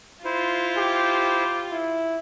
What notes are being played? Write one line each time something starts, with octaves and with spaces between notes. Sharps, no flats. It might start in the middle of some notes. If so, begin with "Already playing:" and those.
E4 F4 C5
G4
E4